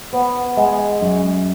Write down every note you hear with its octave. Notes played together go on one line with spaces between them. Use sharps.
B3
G#3
F#2